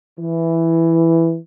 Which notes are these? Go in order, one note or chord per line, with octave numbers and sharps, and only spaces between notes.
E3